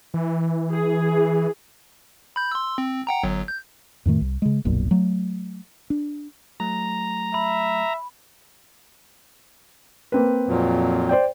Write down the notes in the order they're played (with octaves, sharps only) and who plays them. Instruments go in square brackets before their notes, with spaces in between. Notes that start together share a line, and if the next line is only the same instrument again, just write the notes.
[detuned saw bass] E3
[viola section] G#4
[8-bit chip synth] B5 G6
C6 E6
C4
F#5 G5 A#5
G1 F#3
G6
[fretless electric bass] F2 A2 D#3 A3
C2
C#3 G#3
D#1 B1 F#2 A#2
F#3 A3
D4
[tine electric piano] F#3 A3 [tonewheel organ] A#5
[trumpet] E5 [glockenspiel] B5
[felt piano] A#3 C4 B4
[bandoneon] F2 A#2 F#3
[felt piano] C5 D5 G5